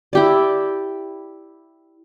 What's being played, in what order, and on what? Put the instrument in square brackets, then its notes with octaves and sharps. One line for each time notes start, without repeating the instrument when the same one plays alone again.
[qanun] E4 G4 D5